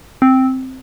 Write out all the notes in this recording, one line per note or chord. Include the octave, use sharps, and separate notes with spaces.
C4